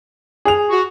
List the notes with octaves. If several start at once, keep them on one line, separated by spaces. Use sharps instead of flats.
G#4 F7
F#4